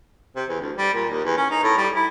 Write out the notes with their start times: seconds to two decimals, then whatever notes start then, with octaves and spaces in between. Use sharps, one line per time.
0.36 C3
0.49 E2
0.61 D2
0.77 G3
0.94 A#2
1.10 D#2
1.24 E2
1.37 C#4
1.50 D#4
1.63 A2
1.77 G3
1.95 E4